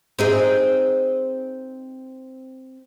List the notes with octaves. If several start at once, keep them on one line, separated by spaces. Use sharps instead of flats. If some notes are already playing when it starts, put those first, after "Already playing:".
C4 D#4 G#4